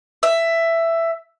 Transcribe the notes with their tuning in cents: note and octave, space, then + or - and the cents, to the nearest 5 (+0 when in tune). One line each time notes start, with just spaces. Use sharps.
E5 +10